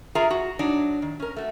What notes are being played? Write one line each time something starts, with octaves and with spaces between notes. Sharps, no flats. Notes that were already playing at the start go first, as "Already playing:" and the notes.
F4 G#4 A#4 E5 A#5
F#4
F#3 D4 D#4
D#3
C#4 A#4
A3 F#4